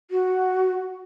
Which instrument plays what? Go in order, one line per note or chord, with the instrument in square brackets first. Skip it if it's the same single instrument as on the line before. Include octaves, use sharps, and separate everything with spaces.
[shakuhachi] F#4